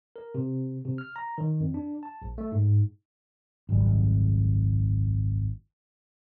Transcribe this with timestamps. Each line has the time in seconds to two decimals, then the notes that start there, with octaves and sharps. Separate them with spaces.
0.16 A#4
0.35 C3
0.85 C3
0.98 F6
1.16 A#5
1.38 D#3
1.60 F2
1.74 D4
2.03 A5
2.22 A#1
2.38 A3
2.52 G#2
3.69 G#1 C#2 F#2 G3